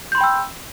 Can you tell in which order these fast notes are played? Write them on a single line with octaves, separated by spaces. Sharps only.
G6 C6 B5 G5 E6